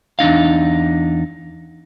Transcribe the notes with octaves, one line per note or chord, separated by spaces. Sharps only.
E2 D4 D#4 F5